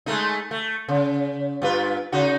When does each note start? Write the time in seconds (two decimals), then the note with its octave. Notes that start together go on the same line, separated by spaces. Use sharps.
0.06 G#3 A3 D#4
0.51 A3
0.89 C#3
1.62 G2 F4 B4
2.12 C#3 D#4 F#4